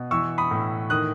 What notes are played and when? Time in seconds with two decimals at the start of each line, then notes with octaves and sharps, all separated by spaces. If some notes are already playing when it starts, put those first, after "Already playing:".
Already playing: B2
0.11 E3 C#6 E6
0.38 B5 D#6
0.51 A2
0.90 D#3 D#6 F#6